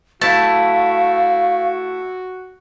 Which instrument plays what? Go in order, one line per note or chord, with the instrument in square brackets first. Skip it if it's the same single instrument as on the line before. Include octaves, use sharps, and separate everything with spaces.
[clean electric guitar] A3 E4 [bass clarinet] F#4 [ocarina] F5 [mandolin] A5